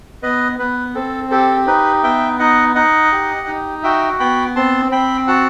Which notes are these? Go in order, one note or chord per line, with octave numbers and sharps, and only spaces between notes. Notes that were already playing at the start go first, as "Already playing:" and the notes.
B3 B4 D#5
B3 B4
C4 A4
G4 A4
D#4 B4
B3 E5 G5
D#4 D#5 F#5
D#4 D#5 F#5
G4
D#4
F#4 E5 G5
B3 G5 B5
C4 A5 C6
C4 G5 B5
F#4 F#5 A5